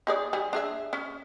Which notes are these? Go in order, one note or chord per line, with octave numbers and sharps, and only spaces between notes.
D#4 G#4 D5
G3 G#4
D4 G#4 E5
C#4